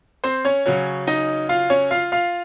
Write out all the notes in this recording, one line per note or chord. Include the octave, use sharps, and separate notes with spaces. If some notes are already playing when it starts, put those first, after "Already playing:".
C4 C5
C#4 C#5
C#3 F#3 C#4
D#4 D#5
F4 F5
C#4 C#5
F4 F5
F4 F5